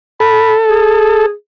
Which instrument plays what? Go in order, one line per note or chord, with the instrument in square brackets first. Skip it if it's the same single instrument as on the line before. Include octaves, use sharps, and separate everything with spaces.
[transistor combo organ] A4 [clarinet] B5
[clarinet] G#4